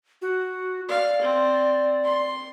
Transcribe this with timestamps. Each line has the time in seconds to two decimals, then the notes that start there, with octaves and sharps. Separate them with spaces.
0.22 F#4
0.89 D5 F5
1.21 C4
2.04 C6